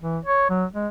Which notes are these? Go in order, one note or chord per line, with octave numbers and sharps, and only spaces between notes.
E3
C#5
F#3
G#3